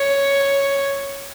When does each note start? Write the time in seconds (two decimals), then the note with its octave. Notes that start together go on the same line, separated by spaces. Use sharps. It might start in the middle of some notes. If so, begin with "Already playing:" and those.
Already playing: C#5